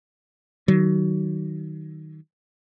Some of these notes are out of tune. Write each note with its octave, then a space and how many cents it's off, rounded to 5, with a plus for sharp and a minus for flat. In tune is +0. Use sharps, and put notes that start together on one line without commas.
D#3 +0 F#3 +25